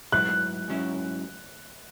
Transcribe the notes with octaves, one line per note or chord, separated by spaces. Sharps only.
G#2 F#3 E4 B4 F#6
G#2 F#3 C#4 E4